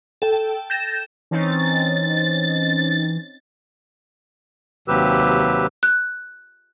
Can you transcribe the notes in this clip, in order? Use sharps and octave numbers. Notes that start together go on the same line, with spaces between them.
A4 G5
G6 A6 A#6 E7
E3 C4 C#4 D#4 A6
D#2 C3 F#3 G4 B4 E6
F#6